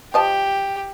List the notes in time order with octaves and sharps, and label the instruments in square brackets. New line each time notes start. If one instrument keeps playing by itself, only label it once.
[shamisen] F3 D#5 A5 [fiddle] G4